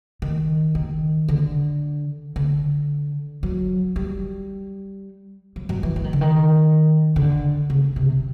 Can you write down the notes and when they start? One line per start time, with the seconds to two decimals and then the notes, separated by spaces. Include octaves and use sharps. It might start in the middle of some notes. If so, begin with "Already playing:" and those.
0.22 D#3
0.75 D#3
1.28 D3
2.36 D3
3.43 F#3
3.96 G3
5.56 F#3
5.69 F#3
5.83 E3
5.96 E3
6.04 D#3
6.13 D3
6.21 D#3
7.16 D3
7.70 C#3
7.96 C3